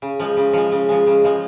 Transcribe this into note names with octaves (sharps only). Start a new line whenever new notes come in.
C#3
F3 G#3
C#3
F3 G#3
C#3
F3 G#3
C#3
F3 G#3